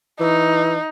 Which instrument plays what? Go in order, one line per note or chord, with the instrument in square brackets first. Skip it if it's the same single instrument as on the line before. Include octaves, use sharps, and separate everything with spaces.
[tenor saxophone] E3 [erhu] D#4